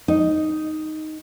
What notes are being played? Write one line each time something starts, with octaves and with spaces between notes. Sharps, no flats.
D#4